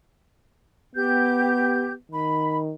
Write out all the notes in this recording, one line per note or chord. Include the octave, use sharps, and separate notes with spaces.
B3 G4 G6
D#3 B5